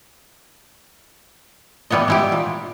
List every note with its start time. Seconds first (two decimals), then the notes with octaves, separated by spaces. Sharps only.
1.90 E3 G3 B3 C#5 D#5
2.08 G#3 E4 G4
2.32 A#2